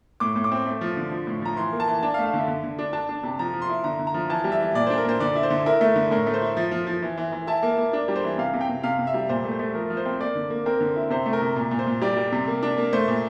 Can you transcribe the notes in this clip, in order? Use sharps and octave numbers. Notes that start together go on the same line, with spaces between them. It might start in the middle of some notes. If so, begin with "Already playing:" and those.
A2 D6
A2
D6
C4
A3
F3
D3
F3
A2
F3 A#5
E3 C6
A#3
A5
E3
D4 A5
F5
A3
F5
D3 E5
D3
D3
D4
D4 A5
D4
C3
F3 A#5
F3
C6
E4
D3 A#5
D3
A#5
F3
E3 A5
G3
E5
E3
A#2 D5
D4 C5
A#4
A#2 C5
D3 D5
E4
C5
D3
E4 A#4
A3
D3
A2 A#4
A3
C5
E4
F3
F3
F3
E3
E3
E3
E4 A5
A#3
A#3
D4
G3
C5
E3
C3 F5
C3
G5
C3
C3 F5
C3
E5
G3
A#2 C5
A3
C5
A3
F3 A#4
F3
C5
C4
A#3 D5
D3
A#3
C4 A#4
D3
E4
C3 C5
A3
A#4
C3
A#2
A#2
C5
A#2
G3 D5
G3
C3
A#3
D4
A#3
A3 C5
A#2